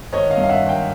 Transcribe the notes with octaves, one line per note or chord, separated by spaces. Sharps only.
G#1 C#5 D#5
D#5 F5
G2
F5
E5 F#5
G#1
F5 G5